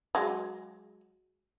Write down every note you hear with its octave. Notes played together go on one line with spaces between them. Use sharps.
F#3 G#3